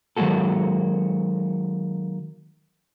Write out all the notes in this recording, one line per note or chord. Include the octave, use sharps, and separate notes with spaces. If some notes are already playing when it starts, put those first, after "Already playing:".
D#3 F#3 G#3 A#3 F#4 A4